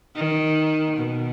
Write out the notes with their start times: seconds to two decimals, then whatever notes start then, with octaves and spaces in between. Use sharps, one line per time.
0.16 D#3
0.97 B2